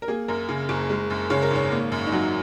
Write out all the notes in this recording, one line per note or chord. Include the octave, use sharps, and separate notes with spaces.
A#4
A#3 G#4
F#2 A#4
C#3
F#1
G#3
F#2
C#3 C#5
A#4
G#1 C#5
A#3
F#2
D#4
F#3 F#4